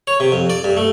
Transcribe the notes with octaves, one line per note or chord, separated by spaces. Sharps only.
C#5
C3
F2
D5
G2
A3